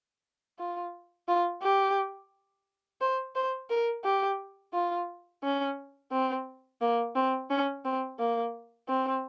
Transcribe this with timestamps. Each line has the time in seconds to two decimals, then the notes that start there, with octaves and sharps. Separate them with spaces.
0.59 F4
1.28 F4
1.62 G4
3.01 C5
3.35 C5
3.70 A#4
4.04 G4
4.73 F4
5.43 C#4
6.11 C4
6.81 A#3
7.15 C4
7.50 C#4
7.85 C4
8.19 A#3
8.88 C4